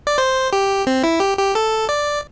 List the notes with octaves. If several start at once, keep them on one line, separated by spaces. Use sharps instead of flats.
D5
C5
G4
C4
E4
G4
G4
A4
D5